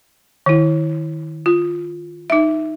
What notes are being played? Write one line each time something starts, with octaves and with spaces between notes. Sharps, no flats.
D#3 E4
F4
D#4 E5